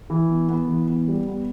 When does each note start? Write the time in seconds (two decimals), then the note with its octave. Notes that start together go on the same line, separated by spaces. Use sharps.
0.10 E3
0.29 B3
0.49 B3
0.68 E3
0.87 B3
1.08 G3
1.27 B3